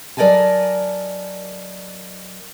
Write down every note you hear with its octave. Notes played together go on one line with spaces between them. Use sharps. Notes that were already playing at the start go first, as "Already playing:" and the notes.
F#3 A#4 D5 D#5 G#5 A5